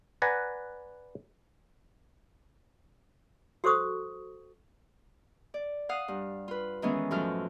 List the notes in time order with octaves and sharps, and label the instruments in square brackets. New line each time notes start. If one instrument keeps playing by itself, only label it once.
[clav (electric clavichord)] B4 D5 F#5 G#5 A#5
[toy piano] F#4 A4 C5 C#6 D#6
[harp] D5
F5 F#5 D#6
G2
F4 B4
D#3 E3 G#3 B3 C#4
F#2 A2 F3 F#3 A4 F6